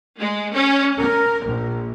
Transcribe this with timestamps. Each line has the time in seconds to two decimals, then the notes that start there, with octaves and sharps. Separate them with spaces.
0.18 G#3
0.52 C#4
0.99 A#4
1.45 A#1